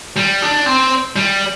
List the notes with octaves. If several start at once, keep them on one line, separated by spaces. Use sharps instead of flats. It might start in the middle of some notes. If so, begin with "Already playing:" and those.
G3
D4
C4
G3